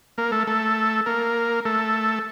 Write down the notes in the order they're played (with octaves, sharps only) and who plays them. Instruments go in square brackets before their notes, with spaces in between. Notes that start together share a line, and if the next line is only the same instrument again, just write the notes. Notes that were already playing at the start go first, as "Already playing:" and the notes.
[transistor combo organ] A#3 A#4
A3 A4
A3 A4
A#3 A#4
A3 A4